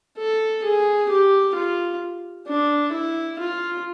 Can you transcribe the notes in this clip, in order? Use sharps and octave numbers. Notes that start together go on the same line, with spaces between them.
A4
G#4
G4
F4
D4
E4
F4